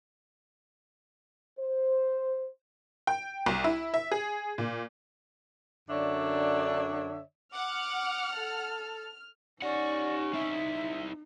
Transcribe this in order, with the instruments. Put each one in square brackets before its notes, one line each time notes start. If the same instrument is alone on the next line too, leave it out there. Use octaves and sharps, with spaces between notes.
[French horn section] C5
[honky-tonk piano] G5
C2
E4
E5
G#4
A#2
[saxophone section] F#2 D3 D4 C#5 D5 E5
[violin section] F#5 [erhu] D6 [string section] F6
[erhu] A4
[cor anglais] C#4 [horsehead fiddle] D#4 [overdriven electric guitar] G4 F#5 [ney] D5
[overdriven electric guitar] C4 E4 [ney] E5